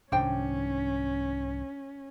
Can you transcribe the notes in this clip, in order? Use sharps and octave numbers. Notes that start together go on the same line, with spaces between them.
C2 G#2 D#3 C#4 D4 C5 G5